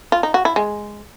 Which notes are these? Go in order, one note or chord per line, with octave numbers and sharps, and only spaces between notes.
F4
D#4
F#4
E4
G#3